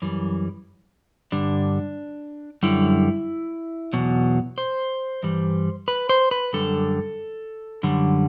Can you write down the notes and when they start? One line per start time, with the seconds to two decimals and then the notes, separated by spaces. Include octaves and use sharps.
0.02 F#2 E3 G3
1.32 G2 D3 G3 D4
2.63 F#2 D3 G3 E4
3.93 E2 B2 F#3
4.58 C5
5.23 G2 E3 G3
5.88 B4
6.09 C5
6.31 B4
6.53 F#2 D3 G3 A4
7.83 F#2 D3 G3